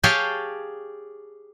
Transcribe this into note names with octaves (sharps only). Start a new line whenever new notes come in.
G4 G#4 C#5 F5 G5 A5